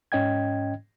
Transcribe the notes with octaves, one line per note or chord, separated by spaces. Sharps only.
G#2 C#4 D#5 G5 G#6